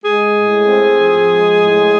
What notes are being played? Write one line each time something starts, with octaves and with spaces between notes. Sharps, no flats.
G#3 G#4
A2
C4
F3
G#3
A2